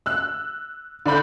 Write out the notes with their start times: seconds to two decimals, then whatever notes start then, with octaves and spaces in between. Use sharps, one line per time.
0.06 E6 F#6
1.06 D3 D4 B5 G6